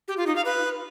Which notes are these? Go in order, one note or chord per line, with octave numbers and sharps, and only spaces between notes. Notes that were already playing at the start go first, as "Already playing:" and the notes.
G4
F4
D#4
F5
B4